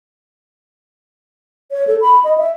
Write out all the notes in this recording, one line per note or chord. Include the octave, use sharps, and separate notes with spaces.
C#5
A4
B5
D#5
E5